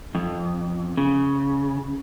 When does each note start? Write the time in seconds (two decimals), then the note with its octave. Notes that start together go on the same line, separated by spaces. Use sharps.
0.15 F2
0.97 C#3